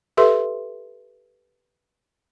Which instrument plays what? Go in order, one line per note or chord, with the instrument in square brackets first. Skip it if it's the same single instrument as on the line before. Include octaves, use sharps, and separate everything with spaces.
[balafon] G4 A4 B4 E5 C6